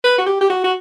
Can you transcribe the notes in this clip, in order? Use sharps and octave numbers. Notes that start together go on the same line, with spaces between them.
B4
F#4
G4
G4
F#4
F#4